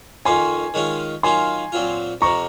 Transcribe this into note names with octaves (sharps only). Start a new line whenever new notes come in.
F2 D#3 A#3 C#4 G#5 C6
D#3 G#3 C#4 F4
D#3 F#3 A#3 F4 G#5 C6
A#2 F#3 C4 F4
F2 C3 F3 A#5 C#6